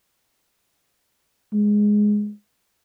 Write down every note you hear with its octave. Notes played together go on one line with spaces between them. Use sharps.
G#3